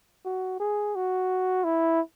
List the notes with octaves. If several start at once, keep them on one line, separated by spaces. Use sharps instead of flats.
F#4
G#4
F#4
E4